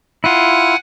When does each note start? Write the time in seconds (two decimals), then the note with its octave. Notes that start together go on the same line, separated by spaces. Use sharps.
0.24 E4 F4 F#5 G#5 F#6